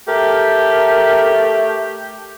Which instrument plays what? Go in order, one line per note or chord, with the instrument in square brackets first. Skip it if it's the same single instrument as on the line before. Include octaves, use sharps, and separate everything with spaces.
[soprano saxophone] A3 [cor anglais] G4 [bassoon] A#4